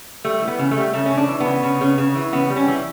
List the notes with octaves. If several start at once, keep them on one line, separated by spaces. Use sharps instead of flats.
G3 A3
E3
B3
C#3
A3
G3
C#3 A3
C#4
C#3
D4
E3
B3
C#3
C#3
C#3
C#3
E3
C#3 B3
G3
C#4
E3